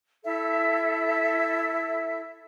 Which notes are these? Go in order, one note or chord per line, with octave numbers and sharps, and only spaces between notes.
E4 A4 E5